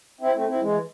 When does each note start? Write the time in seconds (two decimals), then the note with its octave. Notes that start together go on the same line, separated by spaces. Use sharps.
0.21 C4 E4
0.34 A3 C4
0.48 C4 E4
0.61 E3 G#3